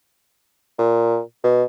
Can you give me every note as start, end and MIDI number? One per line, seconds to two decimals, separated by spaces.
0.79 1.21 46
1.44 1.64 47